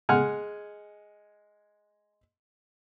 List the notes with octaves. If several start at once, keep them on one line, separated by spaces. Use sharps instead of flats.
G#3 F#5 G#5 F6